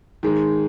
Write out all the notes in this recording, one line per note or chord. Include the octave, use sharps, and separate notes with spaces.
D#3 G#3